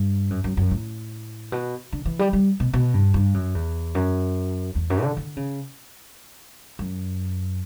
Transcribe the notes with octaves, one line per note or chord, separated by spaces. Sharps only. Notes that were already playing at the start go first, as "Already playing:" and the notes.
Already playing: G2
F#2
F#2
F#2
A2
B2
D3
E3
G3
G3
B2
B2
G2
G2
F#2
E2
F#2
E2
F#2
D3
D3
C#3
F#2